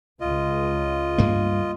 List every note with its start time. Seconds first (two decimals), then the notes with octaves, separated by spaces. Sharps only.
0.21 C#2 F4 D#5
1.18 G2 A#3